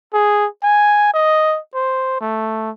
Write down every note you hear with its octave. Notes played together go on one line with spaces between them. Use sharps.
G#4
G#5
D#5
C5
A3